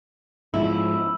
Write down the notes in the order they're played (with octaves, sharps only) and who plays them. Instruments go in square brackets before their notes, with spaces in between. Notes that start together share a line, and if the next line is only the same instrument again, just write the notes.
[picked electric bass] G#2 F3 [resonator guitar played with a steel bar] E4